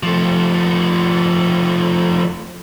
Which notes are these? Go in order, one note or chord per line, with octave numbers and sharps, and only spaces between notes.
F3 A3